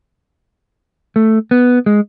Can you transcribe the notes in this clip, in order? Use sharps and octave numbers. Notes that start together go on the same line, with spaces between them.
A3
B3
G#3